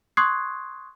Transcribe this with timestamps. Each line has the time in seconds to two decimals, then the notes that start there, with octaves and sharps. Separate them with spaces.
0.17 C6 C#6 D#6 F#6 G#6 C7